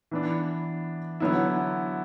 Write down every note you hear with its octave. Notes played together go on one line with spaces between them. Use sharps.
E3 B3 D4
D3 F#3 B3 E4